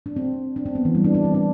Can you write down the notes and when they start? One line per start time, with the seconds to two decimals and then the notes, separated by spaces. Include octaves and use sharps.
0.06 D4
0.16 C4
0.56 D4
0.66 C4
0.75 B3
0.85 E3
0.95 G3
1.04 D4
1.15 D4
1.24 C4
1.34 D4